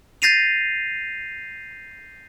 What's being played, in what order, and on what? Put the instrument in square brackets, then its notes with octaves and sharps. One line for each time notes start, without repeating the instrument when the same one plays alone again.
[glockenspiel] G6 A6 A#6 C7 D#7 F7